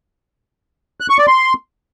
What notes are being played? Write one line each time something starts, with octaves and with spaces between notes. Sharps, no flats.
F#6
C#6
D5
C6